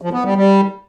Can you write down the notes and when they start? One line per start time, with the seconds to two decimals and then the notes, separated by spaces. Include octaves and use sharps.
0.02 F3
0.13 B3
0.25 G3
0.36 G3